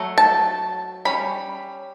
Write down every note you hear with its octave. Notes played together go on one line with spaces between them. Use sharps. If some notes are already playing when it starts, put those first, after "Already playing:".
Already playing: F#3 A3
A5
G3 C#4 B5